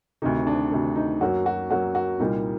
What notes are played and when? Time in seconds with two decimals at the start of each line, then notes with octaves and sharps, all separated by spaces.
0.22 D2 C3 D#3 D#4
0.47 D4
0.72 D2 C3 D#3
0.96 D#4
1.21 F#2 F#3 A#3 F#4
1.46 F#4
1.70 F#2 F#3 A#3 F#4
1.95 F#4
2.20 C2 A#2 G3 A#3 D#4